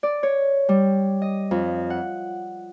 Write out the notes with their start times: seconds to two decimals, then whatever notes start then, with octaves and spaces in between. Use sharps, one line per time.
0.03 D5
0.23 C#5
0.69 G3
1.22 D#5
1.51 F2
1.90 F#5